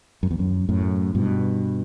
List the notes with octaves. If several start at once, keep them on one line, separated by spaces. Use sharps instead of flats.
F#2
E2
F#2
F#2 A2
G2 B2